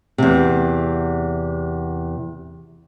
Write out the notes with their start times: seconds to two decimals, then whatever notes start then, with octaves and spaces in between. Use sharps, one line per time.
0.18 E2 C3